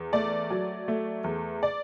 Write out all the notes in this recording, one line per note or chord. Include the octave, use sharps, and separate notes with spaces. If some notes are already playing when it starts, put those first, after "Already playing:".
Already playing: E2
A3 D5
F#3
A3
E2
D5